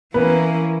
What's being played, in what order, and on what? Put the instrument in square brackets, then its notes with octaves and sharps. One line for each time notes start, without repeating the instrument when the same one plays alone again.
[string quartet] E3 A#3 C#4 E4 [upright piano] B3 B4